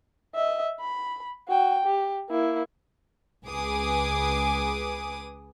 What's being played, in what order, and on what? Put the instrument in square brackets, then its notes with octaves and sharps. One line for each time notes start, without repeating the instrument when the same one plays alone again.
[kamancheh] D#5 E5
B5
F#4 G5
G4
A#3 E4
[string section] C#2 G#4 B4 G#5 D6 D#6